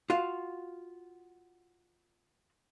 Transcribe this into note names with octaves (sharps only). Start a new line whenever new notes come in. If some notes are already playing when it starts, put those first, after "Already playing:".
F4 F#4 F5